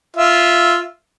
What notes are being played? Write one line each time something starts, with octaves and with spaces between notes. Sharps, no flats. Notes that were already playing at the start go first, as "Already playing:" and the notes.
F4 E5